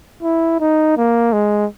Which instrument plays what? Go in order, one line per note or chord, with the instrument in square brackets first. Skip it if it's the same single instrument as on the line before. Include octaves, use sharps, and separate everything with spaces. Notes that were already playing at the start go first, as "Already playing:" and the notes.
[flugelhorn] E4
D#4
A#3
G#3